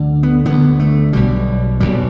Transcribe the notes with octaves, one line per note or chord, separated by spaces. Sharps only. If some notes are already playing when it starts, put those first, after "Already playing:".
Already playing: D2 D3
B3
D2 D3 B3
A3
B1 B2 G3
B1 B2 G3